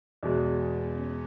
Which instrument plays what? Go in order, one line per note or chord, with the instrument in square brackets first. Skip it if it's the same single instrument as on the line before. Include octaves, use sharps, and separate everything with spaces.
[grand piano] E2 B2 G#3 [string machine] B3
[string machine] C#4